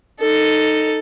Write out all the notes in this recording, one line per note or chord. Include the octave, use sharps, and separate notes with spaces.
D#4 A4